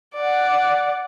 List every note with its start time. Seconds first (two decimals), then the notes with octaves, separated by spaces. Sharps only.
0.15 D5 F#5